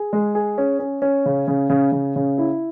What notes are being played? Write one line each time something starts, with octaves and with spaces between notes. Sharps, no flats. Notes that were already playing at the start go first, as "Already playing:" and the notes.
Already playing: G#4
G#3
G#4
C#4
C#4
C#4
C#3
C#3
C#3
C#3
C#3
E4